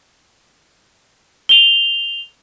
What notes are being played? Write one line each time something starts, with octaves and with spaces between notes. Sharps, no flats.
F7 G7